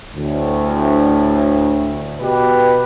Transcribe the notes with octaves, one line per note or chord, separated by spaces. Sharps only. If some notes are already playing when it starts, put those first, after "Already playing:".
D2 A2
B2 G4 B4